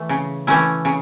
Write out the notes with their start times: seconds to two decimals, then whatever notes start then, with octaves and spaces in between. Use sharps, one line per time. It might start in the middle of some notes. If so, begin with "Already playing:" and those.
Already playing: E3 A3
0.09 C#3
0.47 E3 A3 C#4 E4
0.85 C#3